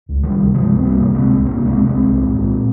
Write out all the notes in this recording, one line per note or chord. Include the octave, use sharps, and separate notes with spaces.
C#2
C#2 D#3 G3
C3
C3 F3 G#3
C#2
C4
C2 G3 A#3
C3
C3 G#3 C4
C2
C2 A#3 C#4
C3 C#4
G#3 C4
C3
C2 G#3 C4
C2
A#2
A#2